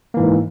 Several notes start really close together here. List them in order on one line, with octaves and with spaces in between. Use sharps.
A#3 E3 G#2